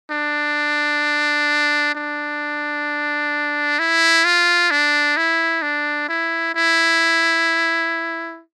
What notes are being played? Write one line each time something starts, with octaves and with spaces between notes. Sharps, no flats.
D4
D4
E4
F4
D4
E4
D4
E4
E4